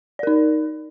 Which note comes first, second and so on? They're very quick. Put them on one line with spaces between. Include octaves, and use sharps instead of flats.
D5 A#4 D#4